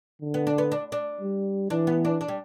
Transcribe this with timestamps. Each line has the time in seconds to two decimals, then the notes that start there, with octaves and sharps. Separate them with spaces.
0.22 D3
0.34 B3
0.47 D4
0.58 B3
0.72 D4
0.92 D4
1.21 G3
1.70 E3 D4
1.87 B3
2.05 D4
2.21 D4
2.28 G3